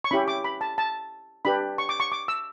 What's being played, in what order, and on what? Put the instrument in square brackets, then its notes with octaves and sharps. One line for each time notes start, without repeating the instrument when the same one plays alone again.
[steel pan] C#6
C#4 E4 G4 B5
D6
B5
A5
A5
D4 G4 B4 B5
C#6
D6
C#6
D6
E6